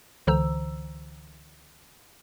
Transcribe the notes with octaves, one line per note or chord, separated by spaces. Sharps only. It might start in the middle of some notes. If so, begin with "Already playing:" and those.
C#2 D3 E3 C5 A#5 E6